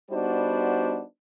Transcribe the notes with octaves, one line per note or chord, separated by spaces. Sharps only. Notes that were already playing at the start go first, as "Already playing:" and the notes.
G3 B3 D4 D#4 F#4 C5